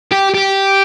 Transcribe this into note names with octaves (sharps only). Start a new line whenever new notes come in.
G4
G4